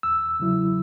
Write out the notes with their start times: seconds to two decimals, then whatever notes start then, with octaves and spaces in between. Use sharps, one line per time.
0.03 E2 E6
0.40 C#3 F#3 E4